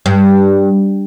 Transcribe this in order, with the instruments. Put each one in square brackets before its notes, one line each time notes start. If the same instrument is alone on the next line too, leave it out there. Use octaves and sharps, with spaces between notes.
[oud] G2